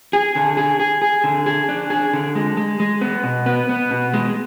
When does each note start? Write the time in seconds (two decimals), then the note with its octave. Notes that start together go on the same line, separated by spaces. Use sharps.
0.13 G#4
0.36 D3
0.57 G#4
0.80 G#4
1.02 G#4
1.24 D3
1.46 G#4
1.69 D4
1.90 G#4
2.14 D3
2.35 G#3
2.57 G#3
2.80 G#3
3.01 B3
3.24 B2
3.46 B3
3.69 B3
3.91 B2
4.14 G#3